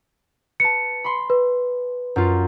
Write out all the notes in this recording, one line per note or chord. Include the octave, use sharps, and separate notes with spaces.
B4 A5 C#7
B5 C6
B4
F#2 F4